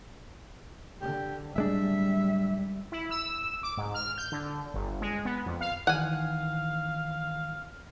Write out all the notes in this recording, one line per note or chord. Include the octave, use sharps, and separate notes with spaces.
D3 G4
D1 G3 G#3 D4 E5
E4
E6
D6
G#2
F6
G6
D3
G1
G#3
B3
F2
F5
D#3 E3 F5 F#5 G#5